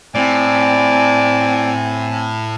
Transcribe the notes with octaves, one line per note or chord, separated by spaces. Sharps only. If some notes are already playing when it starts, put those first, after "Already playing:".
A2 C4 D5 G#5